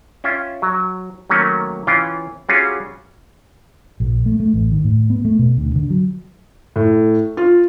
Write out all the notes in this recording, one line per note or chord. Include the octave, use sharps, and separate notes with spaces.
C#4 F4 E5 G5
F#3
D#3 F#3 A3 A#3 C#4
E3 C#4 F4 F5 G5
G3 C#4 F4 F#4 G#4
A#1
A3
A3
A1
D#3
A2
B3
A3
B2
D2
D3
F#3
A2
F4